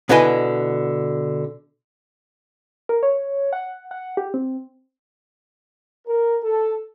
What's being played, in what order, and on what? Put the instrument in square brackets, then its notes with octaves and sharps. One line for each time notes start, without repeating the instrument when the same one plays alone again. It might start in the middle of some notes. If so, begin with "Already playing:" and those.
[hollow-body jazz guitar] B2 D3 E4 B4 D#5 G#5
[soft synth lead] A#4
C#5
F#5
F#5
G4
C4
[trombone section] A#4
A4